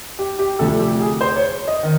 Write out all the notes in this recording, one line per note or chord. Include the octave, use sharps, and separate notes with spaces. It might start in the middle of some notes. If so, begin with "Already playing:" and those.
G4
G4
D2 C3 F3 A4
G4
G#4
C5
C#5
D#5
D#3